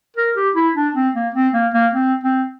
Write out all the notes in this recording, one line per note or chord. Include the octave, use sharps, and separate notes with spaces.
A#4
G4
E4
D4
C4
A#3
C4
A#3
A#3
C4
C4